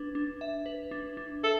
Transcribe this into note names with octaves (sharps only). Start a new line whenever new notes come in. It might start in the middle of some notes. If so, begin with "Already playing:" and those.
Already playing: D4 B4
D4
E5
B4
D4
D4
A4 E5